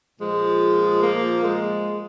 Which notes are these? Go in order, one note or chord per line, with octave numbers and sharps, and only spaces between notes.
A#2 F3 G#3
A#3
G#3